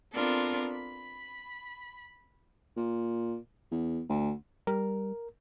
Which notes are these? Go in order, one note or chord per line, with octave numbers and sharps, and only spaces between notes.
B3 C4 D4 F4 A4 A#4
B5
A#2
E2
D2
G3 A#4